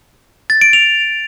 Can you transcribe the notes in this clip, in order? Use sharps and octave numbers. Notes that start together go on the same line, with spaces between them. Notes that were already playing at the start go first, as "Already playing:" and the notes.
A6
D7
F7